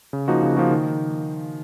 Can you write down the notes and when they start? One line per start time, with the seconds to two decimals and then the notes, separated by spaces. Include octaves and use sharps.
0.13 C#3
0.28 F3 A#3 D#4 F#4
0.43 C#3
0.57 F3 A#3 D#4 F#4
0.71 D#3